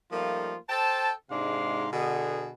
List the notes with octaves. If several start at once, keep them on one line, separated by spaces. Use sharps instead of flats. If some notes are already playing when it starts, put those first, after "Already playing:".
F3 G3 A3 A#3 D#4 F4
A4 C5 G5 A5
G#2 C3 G#3 D4 F5 C6
B2 D3 G#4